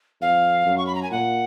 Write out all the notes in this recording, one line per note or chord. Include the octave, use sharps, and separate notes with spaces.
F2 F5
F#2
C#6
B5
A#5
G#5
A#2 F#5